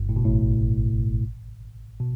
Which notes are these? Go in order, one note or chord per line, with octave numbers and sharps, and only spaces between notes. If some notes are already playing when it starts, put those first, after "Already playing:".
Already playing: G1 G2
A2
B2
A1 A2
B2